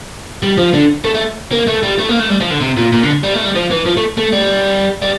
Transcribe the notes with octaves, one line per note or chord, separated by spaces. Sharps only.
G3
F3
D3
A3
A3
A#3
A3
G3
A3
A#3
A3
G3
F3
D3
C3
A#2
A#2
D3
G3
A3
G3
F3
E3
F3
A3
A3
G3
G3